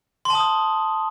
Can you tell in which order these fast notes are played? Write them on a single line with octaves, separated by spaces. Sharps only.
C6 A5 D#6